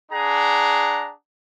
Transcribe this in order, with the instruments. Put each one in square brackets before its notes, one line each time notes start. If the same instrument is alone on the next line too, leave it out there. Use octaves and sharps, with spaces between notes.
[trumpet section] D4 G#4 F#5 A#5